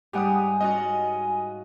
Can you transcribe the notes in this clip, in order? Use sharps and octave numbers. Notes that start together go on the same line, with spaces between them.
G#2 G3 G4 F#5 G#5 D#6
C#4 F4 F#4 D#5